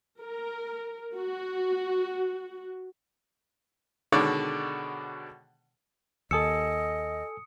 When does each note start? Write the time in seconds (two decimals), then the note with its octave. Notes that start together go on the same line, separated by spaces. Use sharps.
0.22 A#4
1.15 F#4
4.12 B2 D3 D#3 G#3 C#5 D5
6.31 D#2 A4 D#5 G#5 D#6 E6 C#7